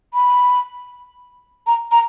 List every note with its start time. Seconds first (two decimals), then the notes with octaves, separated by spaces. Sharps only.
0.14 B5
1.67 A#5
1.91 A#5